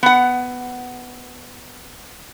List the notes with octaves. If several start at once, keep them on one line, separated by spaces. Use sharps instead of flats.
B3 F#5